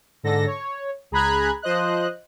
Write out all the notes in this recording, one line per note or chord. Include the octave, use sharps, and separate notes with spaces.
G#2 D3 A4 A#6
C#5
C#2 G#4 A#5 B5 F#6 G#6
F3 C5 D#5 F#6